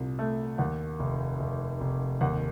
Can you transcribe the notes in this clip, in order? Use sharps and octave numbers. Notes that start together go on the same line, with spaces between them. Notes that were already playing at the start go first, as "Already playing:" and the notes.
Already playing: C2 A#2
A3
D#2 F#5
F1
F1
F1
D#2 F#5